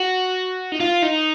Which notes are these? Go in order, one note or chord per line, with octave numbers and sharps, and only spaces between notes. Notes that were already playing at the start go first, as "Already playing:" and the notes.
Already playing: F#4
D#4
F4
D#4